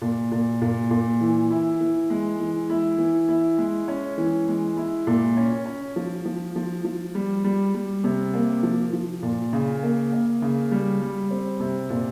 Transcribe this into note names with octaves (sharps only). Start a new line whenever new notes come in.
A#2
A#2
A#2
A#2
E3
E4
E3
G#3
E3
E4
E3
E4
G#3
C#4
E3
G#3
E4
A#2
C#4
C#4
F3
F3
F3
F3
G3
G3
G3
C3
A#3
F3
F3
A#2
C#3
A#3
A#3
C#3
G3
G3
C4
C3
A#2